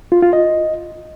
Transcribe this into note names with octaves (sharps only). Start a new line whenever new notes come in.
F4
F4
D#5